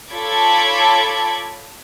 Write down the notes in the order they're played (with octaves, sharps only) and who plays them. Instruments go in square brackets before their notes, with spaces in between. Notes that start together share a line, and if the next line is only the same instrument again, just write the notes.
[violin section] F4 A4 C#5 B5 D6 G#6